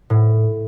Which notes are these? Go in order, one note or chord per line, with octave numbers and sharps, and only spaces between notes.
A2